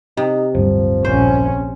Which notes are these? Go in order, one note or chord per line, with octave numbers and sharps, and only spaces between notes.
C3 D#4
D1 G2 F3 G3
A#1 C#4 C5